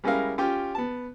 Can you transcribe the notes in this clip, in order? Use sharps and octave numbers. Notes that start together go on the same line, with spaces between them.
G3 G#3 C#4 E4 A#4 F5
C#4 F4 G4 G5
B3 A5